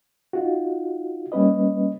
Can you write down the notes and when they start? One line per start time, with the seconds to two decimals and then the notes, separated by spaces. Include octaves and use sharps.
0.33 D#4 F4 F#4
1.32 G3 A#3 C#4 B4 D#5